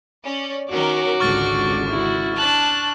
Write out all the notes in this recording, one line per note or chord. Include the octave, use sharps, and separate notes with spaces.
C#4 D5
D#3 C#4 F#4 A#4 D6
G#1 C#2 D3 C#6 F6 A6
E4 F#4
D4 A5 F#6